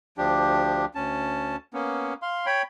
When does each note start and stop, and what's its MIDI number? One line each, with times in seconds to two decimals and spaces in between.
0.18 0.85 38
0.18 0.85 53
0.18 0.85 62
0.18 0.85 67
0.95 1.56 38
0.95 1.56 61
0.95 1.56 81
1.74 2.14 58
1.74 2.14 59
1.74 2.14 61
2.22 2.46 77
2.22 2.46 84
2.46 2.62 73
2.46 2.62 79
2.46 2.62 83